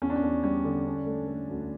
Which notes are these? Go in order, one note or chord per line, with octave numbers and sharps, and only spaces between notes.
E2 C#4
D4
C#4
E2
G3 C#4
D3
D4
A3
A3
D2